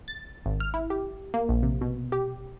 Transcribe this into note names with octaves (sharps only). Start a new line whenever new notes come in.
A6
G#1
F6
E4
G4
A#3
A#1
C3
B2
G4